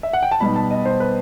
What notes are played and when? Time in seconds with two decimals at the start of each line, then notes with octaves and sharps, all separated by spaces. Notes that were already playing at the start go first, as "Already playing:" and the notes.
0.03 E5
0.13 F#5
0.23 G5
0.31 A5
0.40 B2 G3 B3 D#4 B5
0.56 A5
0.71 D#5
0.85 C5
1.00 B4